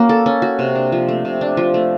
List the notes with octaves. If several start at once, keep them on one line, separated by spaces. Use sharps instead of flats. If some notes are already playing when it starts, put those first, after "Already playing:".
Already playing: A#3 C#4 F#4
A4
C#4
F#4
C3
D4
F3
A3
C3
D4
F3
A3